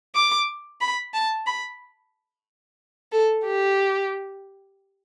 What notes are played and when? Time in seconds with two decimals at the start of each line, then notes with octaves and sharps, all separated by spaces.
0.15 D6
0.81 B5
1.14 A5
1.46 B5
3.12 A4
3.45 G4